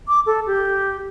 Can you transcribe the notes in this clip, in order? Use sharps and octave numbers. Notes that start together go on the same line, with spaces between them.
D6
A4
G4